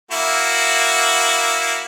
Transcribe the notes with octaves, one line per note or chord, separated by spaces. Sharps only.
A#3 E4 F#4